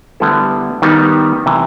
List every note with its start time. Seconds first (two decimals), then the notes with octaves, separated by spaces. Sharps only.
0.20 D3 G3 B3 E4 A4
0.82 D#3 G3 B3 D#4
1.46 C3 E3